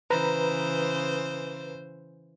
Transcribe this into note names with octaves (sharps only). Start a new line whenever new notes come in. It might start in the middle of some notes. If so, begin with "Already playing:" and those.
C#3 E3 B4 C5 A#5